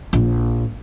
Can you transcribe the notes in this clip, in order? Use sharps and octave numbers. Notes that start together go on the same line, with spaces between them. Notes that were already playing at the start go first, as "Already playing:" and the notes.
A#1